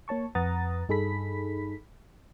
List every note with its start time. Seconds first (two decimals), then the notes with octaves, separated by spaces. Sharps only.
0.08 A#3 C#5 A5 C#6
0.35 F2 B4 F#5 A#5 D#6 A6
0.89 G2 D#4 G#4 A4 B5 B6